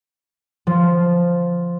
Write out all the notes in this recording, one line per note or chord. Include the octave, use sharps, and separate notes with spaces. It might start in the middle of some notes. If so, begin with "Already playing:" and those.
F3